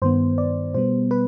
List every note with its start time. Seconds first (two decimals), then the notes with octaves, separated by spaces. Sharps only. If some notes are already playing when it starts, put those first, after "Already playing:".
0.02 G2 D#3 B3 C5
0.38 D5
0.74 B2 G3 B3 C5
1.11 B4